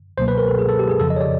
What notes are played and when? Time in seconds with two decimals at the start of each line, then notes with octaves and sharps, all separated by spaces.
0.18 C#2 B2 F#3 A#3 C5
0.28 B4
0.38 A#4
0.48 A4
0.59 G#4
0.69 A4
0.79 G4
0.89 G#4
1.00 F2 C#3 F3 A4
1.10 D#5
1.16 C#5
1.21 D5